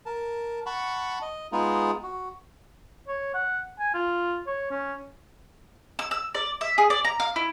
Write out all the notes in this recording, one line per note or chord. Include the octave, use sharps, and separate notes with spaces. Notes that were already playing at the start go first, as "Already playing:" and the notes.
A#4 A5
F#5 A5 B5 C#6
D#5
G#3 B3 D#4 F4 G#4
F#4
C#5
F#5
G#5
F4
C#5
C#4
E6
E6
D5
E5
G#4
D5
A#5
F5
E4